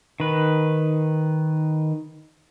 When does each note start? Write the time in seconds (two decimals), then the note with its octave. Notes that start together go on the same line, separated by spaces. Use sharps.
0.20 D#3 B4